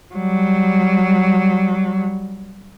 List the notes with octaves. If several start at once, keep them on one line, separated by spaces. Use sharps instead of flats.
F#3 G3